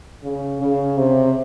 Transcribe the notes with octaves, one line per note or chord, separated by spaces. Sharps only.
C#3
C#3
C3